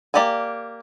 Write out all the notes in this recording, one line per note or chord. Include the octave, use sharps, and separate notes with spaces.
A#3 G4 D5 G5 G#5